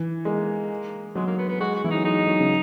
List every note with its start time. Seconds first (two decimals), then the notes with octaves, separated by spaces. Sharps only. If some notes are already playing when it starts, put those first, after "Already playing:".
Already playing: E3
0.25 G#3 A#3
1.15 F#3 G#3
1.27 A#3
1.38 B3
1.49 B3
1.60 G#3 F#4
1.75 F#4
1.84 E3 E4
1.90 F#3 D#4
2.05 G#3 D#4
2.28 F#3
2.40 C#3